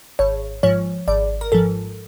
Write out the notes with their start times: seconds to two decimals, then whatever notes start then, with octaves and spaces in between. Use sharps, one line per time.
0.19 G#1 C#5
0.63 G#2 F3 C#5
1.08 G#1 D5
1.41 A#4
1.52 G#2 F3 A4